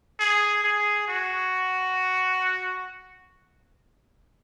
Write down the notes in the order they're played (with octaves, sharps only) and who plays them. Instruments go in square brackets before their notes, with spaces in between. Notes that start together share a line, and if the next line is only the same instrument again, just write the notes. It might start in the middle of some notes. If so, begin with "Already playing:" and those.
[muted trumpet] G#4
G#4
F#4